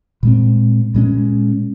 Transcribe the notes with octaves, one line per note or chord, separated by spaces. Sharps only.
A#2 G#3 C4
A#2 G#3 C#4